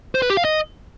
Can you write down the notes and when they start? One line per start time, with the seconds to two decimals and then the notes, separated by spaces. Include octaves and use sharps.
0.15 C5
0.22 B4
0.30 G4
0.37 F5
0.45 D#5